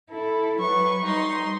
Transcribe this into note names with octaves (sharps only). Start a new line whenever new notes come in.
E4 A4
F#3 B4 C#6
G3 D#4 C6